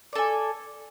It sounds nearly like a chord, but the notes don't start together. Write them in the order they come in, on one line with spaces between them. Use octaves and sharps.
D5 A4 G#5